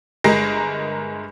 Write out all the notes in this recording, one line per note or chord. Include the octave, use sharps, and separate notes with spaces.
G1 G#3 G#4 A#4 A#6 C7